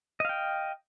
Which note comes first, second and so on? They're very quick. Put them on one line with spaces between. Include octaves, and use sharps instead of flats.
D#5 F5 G5